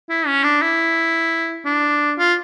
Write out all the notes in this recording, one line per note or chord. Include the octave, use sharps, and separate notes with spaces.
E4
C#4
D4
E4
D4
F4